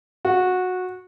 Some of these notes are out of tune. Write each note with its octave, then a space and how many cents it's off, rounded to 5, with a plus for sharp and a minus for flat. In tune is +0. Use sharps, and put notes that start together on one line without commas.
F#4 -15